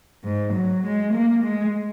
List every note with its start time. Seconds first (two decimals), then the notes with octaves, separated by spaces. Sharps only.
0.24 G#2
0.53 F#3
0.84 G#3
1.13 A#3
1.43 G#3